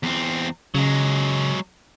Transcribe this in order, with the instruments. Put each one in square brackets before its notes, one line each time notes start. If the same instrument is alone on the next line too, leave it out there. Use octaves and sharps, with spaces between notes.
[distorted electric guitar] E2 C4
[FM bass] C#3 [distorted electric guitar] F#3 G#3